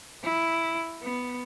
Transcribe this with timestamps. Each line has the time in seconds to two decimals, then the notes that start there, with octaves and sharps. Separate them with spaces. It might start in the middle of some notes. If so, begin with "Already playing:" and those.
0.24 E4
1.03 B3